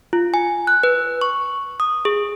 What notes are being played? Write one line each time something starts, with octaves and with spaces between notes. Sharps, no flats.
F4
G#5
F#6
B4
C#6
D#6
G#4